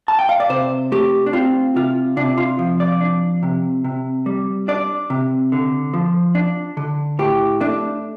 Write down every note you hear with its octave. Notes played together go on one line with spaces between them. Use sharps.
A5
G5
F5
D5
C3 C5
A3 G4
D4
C4 F4
C3 F4
C3 D4
F4
F3
D5
D4
C3
C3
G3
D4 D5
C3
D3
F3
D4
D3
A2 G4
A3 D4